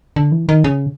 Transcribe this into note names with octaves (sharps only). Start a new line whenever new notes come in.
D3
E3
D#3
C#3